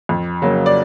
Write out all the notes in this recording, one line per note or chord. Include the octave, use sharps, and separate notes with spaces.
F2
C#3 F#3 A#3
D5